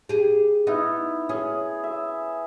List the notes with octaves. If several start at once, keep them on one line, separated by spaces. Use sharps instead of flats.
G4 G#4
B3 D#4 E4
C#4 G#4
E5